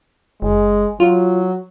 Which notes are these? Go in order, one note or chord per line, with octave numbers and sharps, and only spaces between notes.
F#1 G#3
F#3 F4